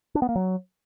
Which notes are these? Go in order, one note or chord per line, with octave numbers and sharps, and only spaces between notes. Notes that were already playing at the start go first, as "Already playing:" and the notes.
D4
B3
A#3
F#3